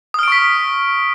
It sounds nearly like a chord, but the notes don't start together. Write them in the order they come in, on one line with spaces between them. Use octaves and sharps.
D#6 F6 D7 C#6 B6